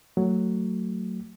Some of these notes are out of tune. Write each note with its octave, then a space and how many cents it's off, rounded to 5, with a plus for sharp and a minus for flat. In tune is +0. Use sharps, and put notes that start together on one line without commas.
F#3 +5 A3 +25